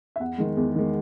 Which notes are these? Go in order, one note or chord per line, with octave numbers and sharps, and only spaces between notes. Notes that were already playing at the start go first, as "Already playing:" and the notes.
E5
E2 F#5
D#3 G#3
E2
D#3 G#3